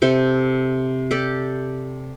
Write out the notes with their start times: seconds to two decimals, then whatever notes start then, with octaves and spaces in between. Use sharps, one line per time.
0.02 C3 A4 C5
1.11 G4 A4 D5